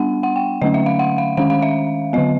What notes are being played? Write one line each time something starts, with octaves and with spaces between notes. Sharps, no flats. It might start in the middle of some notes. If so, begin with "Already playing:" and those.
Already playing: G3 B3 D4 F#5
F#5
G5
D3 F#3 A3 C#4 D#5
E5
F5
F#5
F5
D#3 G#3 C#4 F5
F5
E5
D3 F#3 B3 D#5